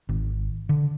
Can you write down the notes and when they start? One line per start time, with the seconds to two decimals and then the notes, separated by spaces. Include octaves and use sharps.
0.09 G#1
0.69 D3